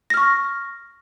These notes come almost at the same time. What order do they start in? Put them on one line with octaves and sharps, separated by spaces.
A#6 F6 C#6